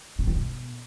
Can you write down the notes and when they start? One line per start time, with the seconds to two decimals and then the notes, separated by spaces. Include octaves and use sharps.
0.19 C3
0.27 D3
0.36 B2